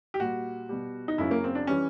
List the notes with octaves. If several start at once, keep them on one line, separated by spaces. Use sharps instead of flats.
G4
A#2 G3 F#4
B2 G3
D#4
F#2 C#3 F#3 E4
A#3
C4
D4
E3 G3 C#4